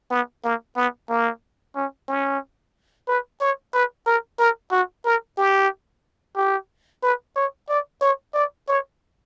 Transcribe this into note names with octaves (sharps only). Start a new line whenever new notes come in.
B3
A#3
B3
A#3
C#4
C#4
B4
C#5
B4
A#4
A#4
F#4
A#4
G4
G4
B4
C#5
D5
C#5
D5
C#5